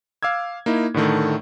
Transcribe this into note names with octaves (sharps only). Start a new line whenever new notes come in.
F5 D6 E6 G#6
A#3 D#4 E4
A2 D3 D#3 A3